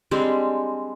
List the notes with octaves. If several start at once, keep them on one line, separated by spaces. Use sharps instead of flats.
G3 G#3 C4 D4